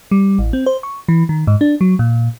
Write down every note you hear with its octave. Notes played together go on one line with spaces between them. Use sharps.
G3
A1
C4
C5
C#6
E3
D#3
G#2
D4
F#3
A#2